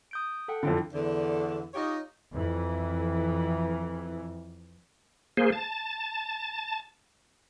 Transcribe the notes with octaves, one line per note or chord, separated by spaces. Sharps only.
D#6 G6 D7
A4 F#5 G5
F2 D3 E4 G5
E2 D3
D#4 F4 G4 C#5 D#5
F2 E3
A#3 G#4 C5
A5